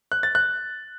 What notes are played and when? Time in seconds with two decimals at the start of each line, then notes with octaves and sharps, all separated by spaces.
0.12 F#6
0.23 A6
0.35 F#6